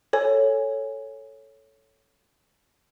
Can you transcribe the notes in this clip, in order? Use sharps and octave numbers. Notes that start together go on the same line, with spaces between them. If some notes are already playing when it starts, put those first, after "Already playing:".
A4 C#5 G#5